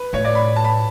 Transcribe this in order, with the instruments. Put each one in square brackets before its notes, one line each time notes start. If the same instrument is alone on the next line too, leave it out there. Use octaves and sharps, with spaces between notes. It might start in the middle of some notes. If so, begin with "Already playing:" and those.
Already playing: [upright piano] B4
[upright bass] A2 [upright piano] C#5
[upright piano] D5
B5
A5
B5